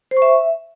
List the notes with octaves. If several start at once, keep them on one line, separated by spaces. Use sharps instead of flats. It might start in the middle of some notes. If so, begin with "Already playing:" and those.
C5
C#6
E5